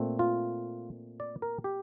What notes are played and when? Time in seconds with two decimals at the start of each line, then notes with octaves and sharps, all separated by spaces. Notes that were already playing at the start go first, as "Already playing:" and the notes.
Already playing: A#2 A3 C4
0.19 F4
1.20 D5
1.42 A#4
1.64 G4